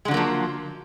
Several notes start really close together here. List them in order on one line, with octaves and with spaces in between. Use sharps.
G#3 D3 F#3 A#3 F3